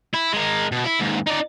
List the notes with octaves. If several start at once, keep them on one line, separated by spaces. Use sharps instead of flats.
E4
G#3 A#4
B2
E4
D#2 G#2
D#4 D5